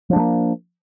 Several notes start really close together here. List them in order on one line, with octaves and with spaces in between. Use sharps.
F3 D4 G#3 A#3